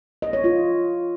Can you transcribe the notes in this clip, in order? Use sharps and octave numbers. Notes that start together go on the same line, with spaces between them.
D#5
C#5
F4